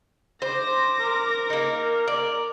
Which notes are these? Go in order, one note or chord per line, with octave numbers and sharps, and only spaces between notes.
C5 D6 A#6
A#4
A#3 D#4
D5